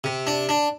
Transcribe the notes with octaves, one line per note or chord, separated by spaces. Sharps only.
C3
D4
D4